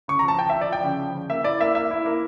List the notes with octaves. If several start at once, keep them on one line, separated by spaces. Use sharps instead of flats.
C#3 C#6
F3 A#5
A5
F3 G5
F3 E5
D5
F3 G5
C#3
F3
C#3
A#3 E5
E4 D5
A#3 E5
A#3 E5
E4
A#3